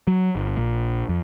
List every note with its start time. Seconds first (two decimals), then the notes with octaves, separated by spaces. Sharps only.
0.07 F#3
0.36 G1
0.58 A#1
1.09 F2